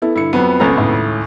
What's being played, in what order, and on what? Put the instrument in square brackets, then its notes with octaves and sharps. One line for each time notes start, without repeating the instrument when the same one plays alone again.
[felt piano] B3 E4 A4
[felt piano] G2 D3 C#7 [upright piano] E4
[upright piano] F2 B3 [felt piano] F#3 [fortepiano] B4
[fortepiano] C#2 C#5 A#5 [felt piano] A4
[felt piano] D#2 A2